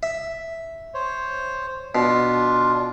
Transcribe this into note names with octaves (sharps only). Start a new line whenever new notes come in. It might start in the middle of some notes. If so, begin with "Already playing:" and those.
E5
C5 C#5
B2 D4 F4